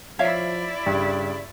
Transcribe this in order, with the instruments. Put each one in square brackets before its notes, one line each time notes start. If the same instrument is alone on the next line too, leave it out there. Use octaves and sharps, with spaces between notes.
[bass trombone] F3 [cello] E4 D5 [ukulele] C#5 E5 F5
[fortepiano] G2 [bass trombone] C#3